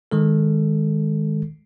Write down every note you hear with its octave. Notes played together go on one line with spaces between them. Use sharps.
D#3 G#3 A4